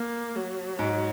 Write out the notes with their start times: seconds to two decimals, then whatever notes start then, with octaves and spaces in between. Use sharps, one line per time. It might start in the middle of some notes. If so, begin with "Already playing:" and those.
Already playing: A#3
0.35 F#3
0.79 G#2